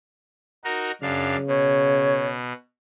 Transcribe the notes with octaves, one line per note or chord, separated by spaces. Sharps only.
D#4 F#4 A#4
F#2 C#3 D4 F5
B2 C#5